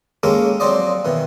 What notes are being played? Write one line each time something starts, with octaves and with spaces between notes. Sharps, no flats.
G#3 A#3 C#4 G4 A4 A#4
F3 F#3 C4 C5 D5 D#5
B2 D#3 E3